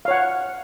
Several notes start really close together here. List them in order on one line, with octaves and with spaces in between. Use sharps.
F5 C#5 F#5